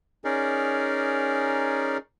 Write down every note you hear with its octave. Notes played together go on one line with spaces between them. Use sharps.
C#4 D#4 G#4 A#4 D5